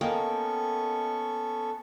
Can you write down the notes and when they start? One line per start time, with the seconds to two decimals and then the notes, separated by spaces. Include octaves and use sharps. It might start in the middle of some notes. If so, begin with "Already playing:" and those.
0.01 A#3 B3 C#4 A4 A#4 D#5 G5 C#6